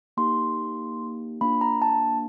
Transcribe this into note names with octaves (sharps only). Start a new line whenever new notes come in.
A#3 D#4 G4 C6
A#3 D4 F4 B5
A#5
A5